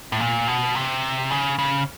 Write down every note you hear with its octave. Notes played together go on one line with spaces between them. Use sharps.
A2
A#2
B2
C3
C#3
C#3